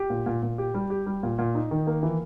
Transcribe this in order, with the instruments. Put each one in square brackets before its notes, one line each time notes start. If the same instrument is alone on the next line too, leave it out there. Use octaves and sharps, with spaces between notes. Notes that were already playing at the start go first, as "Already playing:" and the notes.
Already playing: [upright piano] G4
A#2
A#2
A#2
G4
G3
G4
G3
A#2
A#2
D#4
D#3
A#3
E3